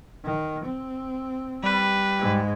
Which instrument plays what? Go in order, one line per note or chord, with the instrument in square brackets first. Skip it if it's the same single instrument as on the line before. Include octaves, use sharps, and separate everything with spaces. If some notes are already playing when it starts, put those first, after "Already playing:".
[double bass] D#3
C4
[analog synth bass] G3 [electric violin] B4
[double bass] G#2 G#3